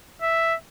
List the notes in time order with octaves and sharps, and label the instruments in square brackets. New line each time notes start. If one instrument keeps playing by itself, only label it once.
[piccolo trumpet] E5